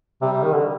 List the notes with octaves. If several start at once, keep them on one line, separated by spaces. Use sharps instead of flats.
C3 G3
C3
D#3
D3